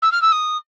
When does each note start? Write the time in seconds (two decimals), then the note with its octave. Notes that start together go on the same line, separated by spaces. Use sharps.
0.02 E6
0.12 F6
0.22 E6
0.32 D#6